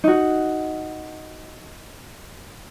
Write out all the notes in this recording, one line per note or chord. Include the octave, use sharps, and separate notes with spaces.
D#4 F#4